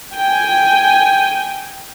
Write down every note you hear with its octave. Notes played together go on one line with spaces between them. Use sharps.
G5 G#5